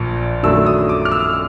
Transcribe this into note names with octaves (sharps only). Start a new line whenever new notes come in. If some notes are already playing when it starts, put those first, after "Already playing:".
Already playing: A#1 A#2
F#2 D#3 F#3 A3 D4 E6
D#6
D6
F6
E6